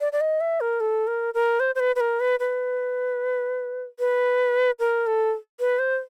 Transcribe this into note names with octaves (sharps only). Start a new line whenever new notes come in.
D5
D5
D#5
E5
A#4
A4
A#4
A#4
C5
C5
B4
B4
A#4
B4
B4
B4
A#4
A4
B4
C5